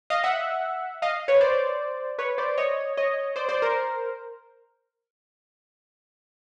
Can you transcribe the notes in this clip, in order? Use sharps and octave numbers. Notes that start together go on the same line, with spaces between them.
D#5 F5
E5 F#5
D#5 F5
B4 C#5
C5 D5
B4 C#5
C5 D5
C#5 D#5
C#5 D#5
C5 D5
C5 D5
A#4 C5